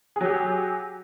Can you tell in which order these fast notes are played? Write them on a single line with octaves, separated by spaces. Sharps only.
G#4 F#3 G4